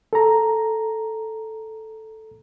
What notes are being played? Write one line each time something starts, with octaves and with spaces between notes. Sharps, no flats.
A4 A#5